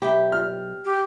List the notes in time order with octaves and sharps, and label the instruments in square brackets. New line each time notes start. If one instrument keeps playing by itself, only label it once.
[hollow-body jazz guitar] B1 E5 B5 [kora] G4
[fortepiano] F6
[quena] G4